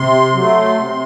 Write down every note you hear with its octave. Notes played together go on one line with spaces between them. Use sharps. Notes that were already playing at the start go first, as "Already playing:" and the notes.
Already playing: C3 C6
F#3 A3
C3